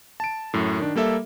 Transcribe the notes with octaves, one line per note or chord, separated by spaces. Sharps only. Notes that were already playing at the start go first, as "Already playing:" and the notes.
A5 D7
F#2 A2
D#3 D4
G3 A#3 A4 E5